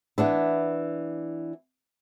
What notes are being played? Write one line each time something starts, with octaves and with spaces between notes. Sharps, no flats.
E3 B3 D4 E4